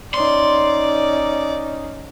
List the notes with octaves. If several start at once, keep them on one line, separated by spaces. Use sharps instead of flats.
C#4 D#4 D5 C6